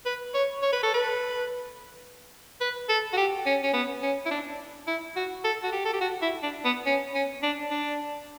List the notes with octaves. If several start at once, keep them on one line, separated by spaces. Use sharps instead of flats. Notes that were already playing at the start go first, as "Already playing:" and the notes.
B4
C#5
C#5
B4
A4
B4
B4
A4
F#4
G4
C#4
C#4
B3
C#4
E4
D4
E4
F#4
A4
F#4
G4
A4
G4
F#4
E4
D4
B3
C#4
C#4
D4
D4